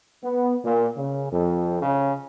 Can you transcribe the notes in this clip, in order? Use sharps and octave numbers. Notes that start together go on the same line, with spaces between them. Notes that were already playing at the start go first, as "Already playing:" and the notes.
B3
A#2
C#3
F2
C#3